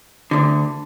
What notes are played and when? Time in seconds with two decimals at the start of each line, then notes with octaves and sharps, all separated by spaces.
0.31 D2 D3